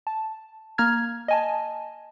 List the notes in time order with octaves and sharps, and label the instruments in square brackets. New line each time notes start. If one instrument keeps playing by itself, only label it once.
[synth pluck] A5
A#3 A#5 F6 G#6
D#5 G#5 A5